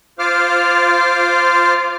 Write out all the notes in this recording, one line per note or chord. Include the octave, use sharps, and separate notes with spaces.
F4 C5 F5 D6 F6